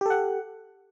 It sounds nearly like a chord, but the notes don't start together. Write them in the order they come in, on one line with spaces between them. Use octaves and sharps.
G4 A4 F#5